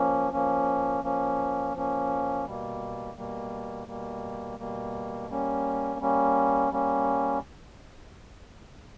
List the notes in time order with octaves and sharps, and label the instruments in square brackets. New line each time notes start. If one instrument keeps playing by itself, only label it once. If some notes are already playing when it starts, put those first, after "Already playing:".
Already playing: [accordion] F3 A#3 C#4
F3 A#3 C#4
F3 A#3 C#4
F3 A#3 C#4
B2 G3 A#3
B2 G3 A#3
B2 G3 A#3
B2 G3 A#3
G3 A#3 C#4
G3 A#3 C#4
G3 A#3 C#4